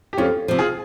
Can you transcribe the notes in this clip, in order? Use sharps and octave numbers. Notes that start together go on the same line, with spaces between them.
G4
F2 C#4 F4
C3 F3
F4 G#4